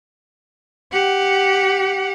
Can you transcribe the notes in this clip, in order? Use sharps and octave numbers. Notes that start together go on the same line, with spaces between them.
G4 F#5